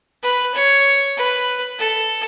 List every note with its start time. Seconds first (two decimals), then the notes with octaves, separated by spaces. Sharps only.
0.23 B4
0.54 C#5
1.17 B4
1.79 A4